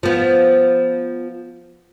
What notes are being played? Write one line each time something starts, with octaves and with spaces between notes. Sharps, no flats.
F3 B3